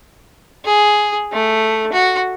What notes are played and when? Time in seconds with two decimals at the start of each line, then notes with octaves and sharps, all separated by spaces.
0.65 G#4
1.32 A3
1.92 F#4